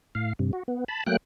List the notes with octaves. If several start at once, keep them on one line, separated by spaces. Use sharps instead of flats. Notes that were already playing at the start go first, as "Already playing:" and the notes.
A2 F5
G2 C3
F#4
B3
A5 B5
F#3 A3 A#3 G5 F#6